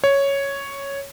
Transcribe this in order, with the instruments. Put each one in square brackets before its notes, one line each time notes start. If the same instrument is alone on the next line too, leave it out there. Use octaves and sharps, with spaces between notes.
[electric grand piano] C#5